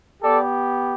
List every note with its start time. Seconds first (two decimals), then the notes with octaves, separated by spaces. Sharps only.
0.22 B3 G4 A4 D5